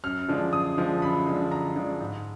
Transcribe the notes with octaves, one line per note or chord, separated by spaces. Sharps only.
F#2 F6
D3 F3 G#3 D4
F#2 D#6
D3 F3 G#3 D4
F#2 B5
D3 F3 G#3 D4
F#2 A#5
D3 F3 G#3 D4
G#2